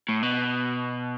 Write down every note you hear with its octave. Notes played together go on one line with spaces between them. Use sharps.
A2
B2